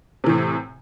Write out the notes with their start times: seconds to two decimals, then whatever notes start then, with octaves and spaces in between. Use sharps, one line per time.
0.24 C3
0.26 E3
0.29 A2